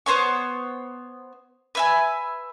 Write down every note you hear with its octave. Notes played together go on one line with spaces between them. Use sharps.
B3 C5 C#5 C#6
B4 E5 G#5